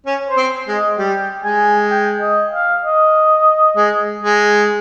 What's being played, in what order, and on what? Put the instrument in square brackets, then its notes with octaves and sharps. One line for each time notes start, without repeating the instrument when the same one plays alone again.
[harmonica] C#4
[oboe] C5
[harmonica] C4
G#3
[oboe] D#5
[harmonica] G3 [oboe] G5
[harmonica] G#3 [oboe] G#5
[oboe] G5
D#5
F5
D#5
[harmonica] G#3
G#3